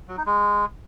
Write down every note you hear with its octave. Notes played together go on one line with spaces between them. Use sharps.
F#3
D#4
G#3